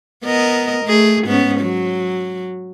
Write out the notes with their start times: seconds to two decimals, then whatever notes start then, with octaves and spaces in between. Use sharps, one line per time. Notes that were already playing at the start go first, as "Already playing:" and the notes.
0.24 B3 A#4 D#5
0.85 A3 G#4
1.26 G#2 B3 C#4
1.60 F#3